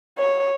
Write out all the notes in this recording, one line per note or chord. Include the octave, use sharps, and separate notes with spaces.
C#5